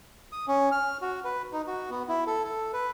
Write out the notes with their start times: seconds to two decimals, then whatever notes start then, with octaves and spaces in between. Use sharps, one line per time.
0.32 D#6
0.48 C#4
0.72 F6
1.02 F#4
1.24 B4
1.53 D#4
1.67 F#4
1.90 B3
2.09 E4
2.27 A4
2.44 A4
2.73 B4